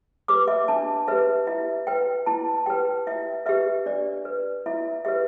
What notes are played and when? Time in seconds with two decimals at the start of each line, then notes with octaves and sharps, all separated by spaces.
0.28 G4 B4 D6
0.48 E5
0.68 D4 A5
1.08 G4 B4 E5
1.47 E4 E5
1.87 B4 G5
2.26 E4 A5
2.66 G4 B4 G5
3.07 E4 E5
3.46 G4 B4 E5
3.86 D4 D5
4.25 B4
4.66 E4 E5
5.05 G4 B4 E5